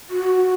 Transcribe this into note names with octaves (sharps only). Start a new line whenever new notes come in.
F#4